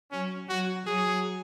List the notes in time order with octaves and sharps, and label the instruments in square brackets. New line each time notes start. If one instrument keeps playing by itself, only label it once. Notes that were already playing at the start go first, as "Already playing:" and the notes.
[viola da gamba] F#3 [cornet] C#4
[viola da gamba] F#3 [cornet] F#4
[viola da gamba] F#3 [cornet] G#4